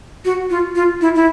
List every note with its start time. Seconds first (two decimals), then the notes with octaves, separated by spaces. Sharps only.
0.25 F#4
0.50 F4
0.75 F4
1.01 E4
1.15 E4